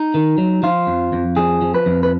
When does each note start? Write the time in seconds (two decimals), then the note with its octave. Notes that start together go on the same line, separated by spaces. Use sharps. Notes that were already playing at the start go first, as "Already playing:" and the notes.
Already playing: D#4
0.14 D#3
0.38 F#3
0.63 F3 F4
0.87 F2
1.13 F2
1.36 F3 G#4
1.62 F3
1.74 B4
1.86 F2
2.03 B4